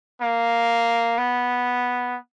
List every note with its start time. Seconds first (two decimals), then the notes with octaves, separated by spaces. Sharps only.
0.22 A#3
1.18 B3